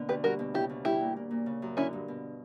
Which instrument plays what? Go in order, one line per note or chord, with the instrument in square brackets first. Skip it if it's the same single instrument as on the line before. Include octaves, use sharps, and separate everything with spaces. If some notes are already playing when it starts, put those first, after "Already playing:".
Already playing: [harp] B2 D3 A#3
[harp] D2 [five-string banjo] G4 B4
[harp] G3 [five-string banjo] F#4 A#4
[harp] B2
[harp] C#3 [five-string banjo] E4 G4
[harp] D2
[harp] G3 [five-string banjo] E4 G4
[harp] A#2
A#3
A#2
C#3
F#2
[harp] D3 [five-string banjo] C#4 E4
[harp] G2
B2